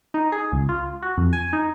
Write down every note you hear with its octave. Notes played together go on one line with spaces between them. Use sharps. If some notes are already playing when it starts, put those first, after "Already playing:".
D#4
G#4
C#2
F4
F#4
F2
G#5
D#4